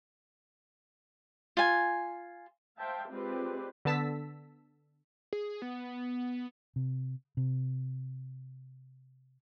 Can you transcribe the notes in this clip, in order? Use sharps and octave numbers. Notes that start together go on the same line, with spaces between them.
F4 G#5
C5 E5 F5 G5 A5
G#3 C4 F4 G4 B4 D5
D3 B3 A5 E6 B6
G#4
B3
C3
C3